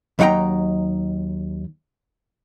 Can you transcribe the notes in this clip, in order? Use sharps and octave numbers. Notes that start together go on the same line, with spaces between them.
D#2 F#3 D#4 F#5 G5 A#5